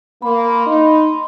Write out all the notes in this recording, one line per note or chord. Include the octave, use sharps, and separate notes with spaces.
A#3 B5 C6
D#4